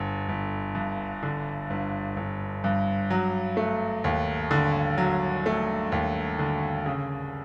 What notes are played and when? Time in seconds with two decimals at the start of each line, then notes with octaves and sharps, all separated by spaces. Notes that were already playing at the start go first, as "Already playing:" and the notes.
Already playing: G1 D3
0.29 G1
0.75 G2
1.23 D3
1.70 G1
2.17 G1
2.64 G2
3.10 F#3
3.57 A3
4.04 D#2
4.51 D3
4.98 F#3
5.46 A3
5.92 D#2
6.39 D3
6.86 C#3